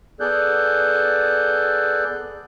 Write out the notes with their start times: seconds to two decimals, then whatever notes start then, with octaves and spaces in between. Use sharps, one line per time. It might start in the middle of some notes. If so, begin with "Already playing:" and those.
0.20 B3 G#4 A4 D5 F#6 G6